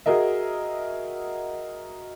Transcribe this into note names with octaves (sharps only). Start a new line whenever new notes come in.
F#4 G#4 A#4 D#5 E5